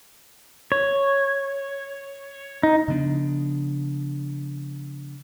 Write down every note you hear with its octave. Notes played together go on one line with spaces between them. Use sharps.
C#5
D#4
C#3 F3 B3 D4